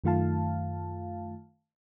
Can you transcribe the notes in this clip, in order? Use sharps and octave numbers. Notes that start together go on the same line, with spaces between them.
F#2 D#3 A3 F4 F5 A5